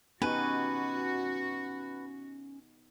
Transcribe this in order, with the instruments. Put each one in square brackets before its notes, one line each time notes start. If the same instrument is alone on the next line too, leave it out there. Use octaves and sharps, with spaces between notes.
[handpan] B3 D#4 G4 [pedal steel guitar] C#4 G#5 C#6 [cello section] F#4 [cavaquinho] B4